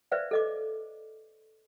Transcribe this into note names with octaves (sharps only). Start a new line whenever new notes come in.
B4 C5 D5 E5 F5
A4 D#5 D6